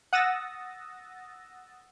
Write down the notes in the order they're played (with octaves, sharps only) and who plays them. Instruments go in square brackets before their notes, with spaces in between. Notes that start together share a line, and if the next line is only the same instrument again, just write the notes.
[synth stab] F#5 D#6 E6 A6 A#6